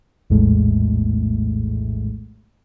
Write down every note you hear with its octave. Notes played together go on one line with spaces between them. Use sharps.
A#1 E2 A2 G#3 A3